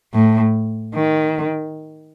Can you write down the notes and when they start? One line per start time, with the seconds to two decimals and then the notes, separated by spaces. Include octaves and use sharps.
0.14 A2
0.94 D#3